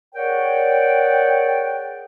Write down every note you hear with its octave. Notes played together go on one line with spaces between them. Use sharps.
G#4 A#4 C#5 D5 F#5 G5